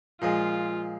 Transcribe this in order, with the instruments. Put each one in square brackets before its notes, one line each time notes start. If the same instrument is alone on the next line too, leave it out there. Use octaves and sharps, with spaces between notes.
[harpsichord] A#2 F3 G#3 [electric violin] F4